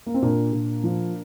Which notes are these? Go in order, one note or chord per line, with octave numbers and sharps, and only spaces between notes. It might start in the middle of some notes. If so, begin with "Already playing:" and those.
A#3
C4
A#2 A#3 D4
A#2
F3